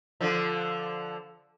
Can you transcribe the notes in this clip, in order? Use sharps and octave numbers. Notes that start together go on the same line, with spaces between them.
D3 F3